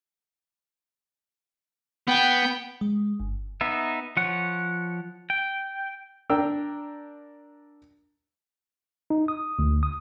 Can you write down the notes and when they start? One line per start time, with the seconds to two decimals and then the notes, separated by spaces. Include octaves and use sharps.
2.07 B3 G5
2.81 G#3
3.20 G1
3.61 B3 D#4 E5
4.17 F3 C#5 F#5
5.30 G5
6.30 D4 A#4 G5 E6
9.10 D#4
9.28 D#6
9.59 D2
9.83 D#6